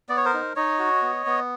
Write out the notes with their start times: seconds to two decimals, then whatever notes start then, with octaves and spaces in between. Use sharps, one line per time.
0.09 B3 D5
0.17 C#5
0.25 A#4 C5
0.33 D#4
0.56 D#4 C#5 D#5
0.79 F#4
1.02 B3
1.26 B3